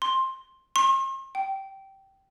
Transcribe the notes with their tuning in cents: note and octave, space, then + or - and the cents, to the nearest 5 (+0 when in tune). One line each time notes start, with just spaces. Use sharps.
C6 +15
C6 +45
G5 -15